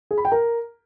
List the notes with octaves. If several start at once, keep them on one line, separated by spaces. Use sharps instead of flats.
G#4
B5
G5
A#4